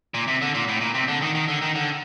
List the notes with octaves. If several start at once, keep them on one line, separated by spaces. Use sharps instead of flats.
A#2
C3
D3
A#2
A2
A#2
C3
D3
D#3
D#3
D3
D#3
D3